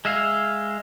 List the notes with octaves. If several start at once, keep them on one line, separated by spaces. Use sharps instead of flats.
G#3 E5 F5